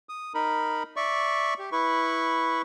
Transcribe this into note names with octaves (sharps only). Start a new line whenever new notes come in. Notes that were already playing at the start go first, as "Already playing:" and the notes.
D#6
D#4 A#4 B5
D5 E5 C#6
G4
E4 B4 C#6